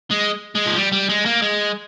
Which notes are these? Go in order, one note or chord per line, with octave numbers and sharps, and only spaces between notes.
G#3
G#3
F3
G3
G3
G#3
A#3
G#3